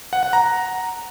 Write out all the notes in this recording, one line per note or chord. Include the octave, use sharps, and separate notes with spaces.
F#5
F#5
A#5